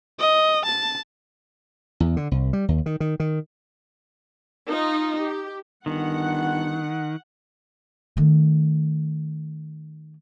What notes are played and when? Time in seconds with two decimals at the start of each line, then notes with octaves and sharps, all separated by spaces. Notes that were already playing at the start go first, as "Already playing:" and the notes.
0.20 D#5
0.66 A5
2.00 E2
2.17 D3
2.31 C2
2.53 G3
2.68 D#2
2.86 D#3
3.00 D#3
3.20 D#3
4.70 D#4 F4
5.19 G4
5.86 G1 D#3 F#5
8.17 D#3 A3